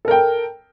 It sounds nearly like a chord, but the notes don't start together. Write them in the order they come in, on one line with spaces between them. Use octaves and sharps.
A4 A#4 G5